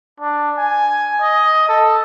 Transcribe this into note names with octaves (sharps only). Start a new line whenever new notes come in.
D4
G#5
D#5
A4